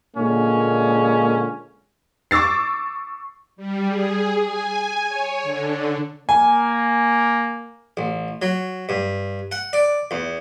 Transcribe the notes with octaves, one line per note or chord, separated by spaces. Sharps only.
A#2 D3 G#3 A#3 C#4
C#6 D6 E6 A6 C7
G3
G#4
G#5
C#5
D3
A#3 G#5
A1
F#3
G2
F#5
D5
E2